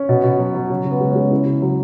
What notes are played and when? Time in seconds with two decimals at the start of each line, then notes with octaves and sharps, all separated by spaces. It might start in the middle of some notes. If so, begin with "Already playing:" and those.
Already playing: C#4
0.09 B2
0.24 B2
0.40 F#3
0.55 F#3
0.70 C#3
0.85 C#3
0.91 B3
1.01 G#3
1.11 G#3 C#4
1.31 C#3 E4
1.47 C#3
1.62 F#3